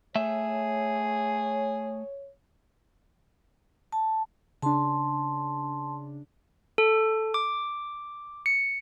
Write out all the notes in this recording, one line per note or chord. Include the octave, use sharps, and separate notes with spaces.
A3 G#4 C#5 E5
A5
C#3 D4 A5 C6
A4
D6
C#7